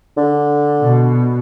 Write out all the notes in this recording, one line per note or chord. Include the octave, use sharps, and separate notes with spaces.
D3
B2